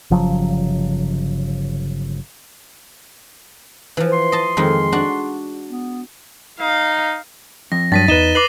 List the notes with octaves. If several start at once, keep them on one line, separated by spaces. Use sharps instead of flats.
G1 C#3 F3 F#3
E3 F3
C6
D#5 A5
F2 D#3 G#3
D4 F#4
B3
D#4 F5
F2 A#6
G2 F#3 A6 B6 D#7
E2 D#4 B4 D#7 E7 G7
B4 D6 C7 F#7